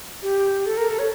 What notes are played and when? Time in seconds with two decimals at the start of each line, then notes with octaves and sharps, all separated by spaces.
0.22 G4
0.66 A4
0.77 A#4
0.89 A4
0.99 C#5